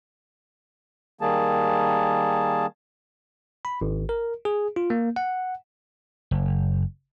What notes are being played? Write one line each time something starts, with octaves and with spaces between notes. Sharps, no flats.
D#3 G3 A#3 G#4 A5
B5
G#1
A#4
G#4
F4
A#3
F#5
F#1